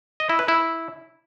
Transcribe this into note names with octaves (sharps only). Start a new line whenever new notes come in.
D#5
E4
B4
E4